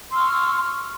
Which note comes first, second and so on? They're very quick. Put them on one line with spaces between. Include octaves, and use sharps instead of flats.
C6 E6 F6 C#6